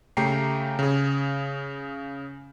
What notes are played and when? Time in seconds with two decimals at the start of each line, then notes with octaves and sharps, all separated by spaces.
0.17 C#3 A3 G4 G5 A#5 C7
0.79 C#3 G#4